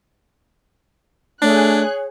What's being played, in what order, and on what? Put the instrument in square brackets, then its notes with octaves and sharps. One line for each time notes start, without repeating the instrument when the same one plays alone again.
[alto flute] A3 [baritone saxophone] D4 [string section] G#4 F#6 [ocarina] C#5